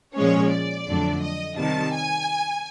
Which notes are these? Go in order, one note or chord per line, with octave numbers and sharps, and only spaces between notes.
A#2 F3 G#3 C#4 C#5
D5
F2 D3 F#3 A3 D4
D#5
C3 D#3 G3 A5
G#5